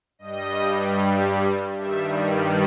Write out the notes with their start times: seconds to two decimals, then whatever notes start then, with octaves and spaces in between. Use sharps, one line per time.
0.19 G2 G3 D#5
1.77 G2 D#3 G3 E5